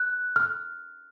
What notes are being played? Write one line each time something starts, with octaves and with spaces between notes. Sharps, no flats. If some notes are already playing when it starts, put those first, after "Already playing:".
Already playing: F#6
F6